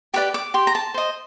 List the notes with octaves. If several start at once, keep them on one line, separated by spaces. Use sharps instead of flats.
G4 B4 D5 D6
D6
G4 C6
A#5
A5
C5 D#5